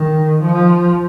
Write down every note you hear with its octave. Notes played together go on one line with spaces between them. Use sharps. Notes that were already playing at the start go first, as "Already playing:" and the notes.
Already playing: D#3
F3